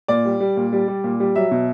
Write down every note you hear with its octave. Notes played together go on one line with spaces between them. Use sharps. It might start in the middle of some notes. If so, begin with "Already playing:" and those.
A#2 D5
G3
G3
A#2
G3
G3
A#2
G3
F#3 E5
B2